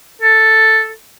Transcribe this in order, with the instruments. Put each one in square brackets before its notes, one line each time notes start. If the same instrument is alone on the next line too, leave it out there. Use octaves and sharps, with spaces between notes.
[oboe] A4